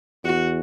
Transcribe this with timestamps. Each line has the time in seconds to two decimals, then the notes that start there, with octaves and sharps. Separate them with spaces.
0.25 E2 F#4